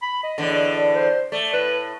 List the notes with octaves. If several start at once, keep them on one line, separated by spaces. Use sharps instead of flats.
B5
D#5
E2 A2 D3
C5
A3 D5
A2 B4